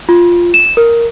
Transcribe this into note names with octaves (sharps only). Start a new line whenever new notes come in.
F4
E7
A#4